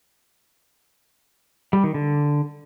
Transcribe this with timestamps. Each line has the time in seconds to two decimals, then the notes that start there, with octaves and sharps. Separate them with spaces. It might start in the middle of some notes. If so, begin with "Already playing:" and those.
1.73 G3
1.84 D#3
1.94 D3